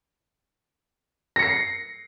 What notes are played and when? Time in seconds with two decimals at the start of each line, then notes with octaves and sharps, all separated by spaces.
1.36 A#6
1.39 C#7
1.42 C7